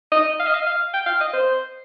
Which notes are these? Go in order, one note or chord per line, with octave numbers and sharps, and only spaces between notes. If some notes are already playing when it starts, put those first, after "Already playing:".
D#5
F5
D#5
F5
F5
G5
F5
D#5
C5